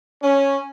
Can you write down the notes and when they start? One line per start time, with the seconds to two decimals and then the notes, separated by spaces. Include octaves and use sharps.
0.23 C#4